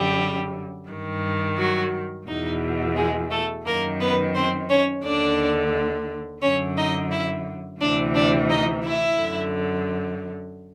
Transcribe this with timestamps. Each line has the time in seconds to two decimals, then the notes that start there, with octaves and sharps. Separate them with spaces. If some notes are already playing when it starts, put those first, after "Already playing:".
Already playing: F#2 D3 G3 G4
0.89 G2 D#3
1.58 F#3 F#4
2.27 E2 B2 D#4
2.96 G#3 G#4
3.30 A3 A4
3.65 F#2 D#3 A#3 A#4
4.00 B3 B4
4.34 C4 C5
4.69 C#4 C#5
5.04 D#2 D3 D4 D5
6.42 F#2 D3 C#4 C#5
6.76 D#4 D#5
7.11 E4 E5
7.80 D2 C3 E3 D4 D5
8.15 D4 D5
8.50 D#4 D#5
8.84 E4 E5
9.19 F#2 D3